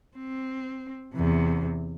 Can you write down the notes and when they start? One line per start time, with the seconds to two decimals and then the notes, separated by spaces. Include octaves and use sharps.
0.17 C4
1.14 E2 C3